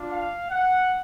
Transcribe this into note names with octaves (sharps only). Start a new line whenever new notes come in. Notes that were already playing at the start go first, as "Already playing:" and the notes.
Already playing: D4 F4
F5
F#5